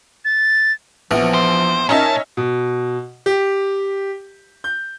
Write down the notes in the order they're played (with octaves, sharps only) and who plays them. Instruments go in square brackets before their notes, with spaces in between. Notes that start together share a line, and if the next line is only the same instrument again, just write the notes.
[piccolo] A6
[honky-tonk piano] A#1 [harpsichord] E3 B3 [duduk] F3
[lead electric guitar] C5
[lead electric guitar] A#2 A5 [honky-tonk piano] C#4 D#4 E5 [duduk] A#4
[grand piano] B2
G4
G6